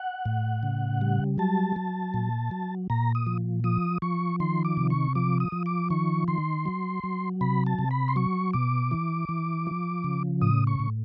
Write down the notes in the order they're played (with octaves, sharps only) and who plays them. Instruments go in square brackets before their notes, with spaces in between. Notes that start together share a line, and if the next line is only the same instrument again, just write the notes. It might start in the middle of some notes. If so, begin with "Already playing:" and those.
Already playing: [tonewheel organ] F#5
A2
C#3
G3
F#3 A5
F#3
A#2
F#3
A#2 A#5
D#6
F3
F3 D#6
F3 C#6
D#3 C6
D6
C3
C#6
F3 D6
D#6
F3
D6
D#3 C#6
D#3 C6
F#3
F#3
C3 B5
A5
C3
B5
C6
F#3 C#6
B2 D6
E3
E3
F3
C#3
A2 D#6
C#6
A2